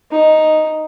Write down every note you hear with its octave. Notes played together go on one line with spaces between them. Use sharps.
D#4